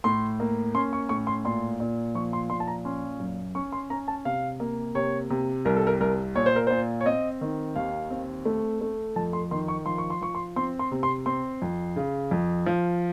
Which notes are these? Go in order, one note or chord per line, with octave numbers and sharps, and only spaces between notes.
A2 C6
A#3
C#4 C6
C#6
A2 C#6
C6
A#2 C6
A#2
F3 C#6
C6
A#2 C6
A5
A#5
C#4 C6
F#2
C#4 C#6
C6
C#4 A#5
A5
C3 F5
A#3
C3 C#5
C3
C2 A#4
A4
A#4
C2 A#4
A#2 C#5
C5
A#4
A#2 C5
C#5
C4 D#5
D#3
D#2 F5
C4
A3
A3
F2 A5
C6
D#3 C6
C#6
F3 C6
C#6
C6
F3 C#6
C6
C4 C6
C6
C3
C6
C4 C6
F2
C#3
F2
F3